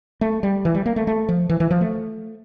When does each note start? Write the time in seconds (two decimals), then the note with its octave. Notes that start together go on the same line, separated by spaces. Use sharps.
0.21 A3
0.43 G3
0.65 E3
0.75 G3
0.86 A#3
0.96 A3
1.07 A3
1.29 F3
1.50 E3
1.60 E3
1.71 F3
1.81 A3